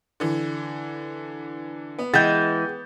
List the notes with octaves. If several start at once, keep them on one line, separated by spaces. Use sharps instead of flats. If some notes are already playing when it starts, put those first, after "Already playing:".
D3 E3
B3
E3 G#3 G#4 F#5 G5 G6 A6